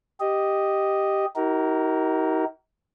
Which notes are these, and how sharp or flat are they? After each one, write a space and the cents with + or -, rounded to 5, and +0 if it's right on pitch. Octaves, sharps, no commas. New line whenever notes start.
G4 +0 D#5 +0
D#4 +40 F#4 +45 A#4 +0